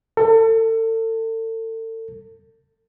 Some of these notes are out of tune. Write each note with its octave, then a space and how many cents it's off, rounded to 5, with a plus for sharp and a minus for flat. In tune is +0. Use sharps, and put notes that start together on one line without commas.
A4 +35